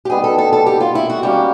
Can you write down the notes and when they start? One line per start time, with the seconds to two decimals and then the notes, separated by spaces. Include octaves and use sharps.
0.05 G4
0.10 D#3 G3 B3 G#4
0.24 A4
0.38 A4
0.53 A4
0.66 G4
0.80 F4
0.95 E4
1.10 F#4
1.23 G3 A#3 C#4 F#4 G4